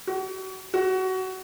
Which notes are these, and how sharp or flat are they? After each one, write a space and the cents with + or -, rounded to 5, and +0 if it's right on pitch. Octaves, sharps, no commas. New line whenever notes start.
F#4 +35
F#4 +20